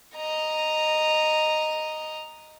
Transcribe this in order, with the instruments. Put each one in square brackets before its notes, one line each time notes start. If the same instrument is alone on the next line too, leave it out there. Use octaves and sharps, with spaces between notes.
[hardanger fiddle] D#5 A#5